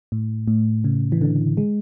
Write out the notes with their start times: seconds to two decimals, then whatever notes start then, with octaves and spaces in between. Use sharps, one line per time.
0.12 A2
0.48 A2
0.84 C#3
1.12 E3
1.21 D3
1.57 G#3